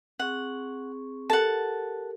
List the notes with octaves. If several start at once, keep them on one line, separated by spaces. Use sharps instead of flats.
C4 G#4 F#5 C#6
G4 A4 A#4 F#5 A5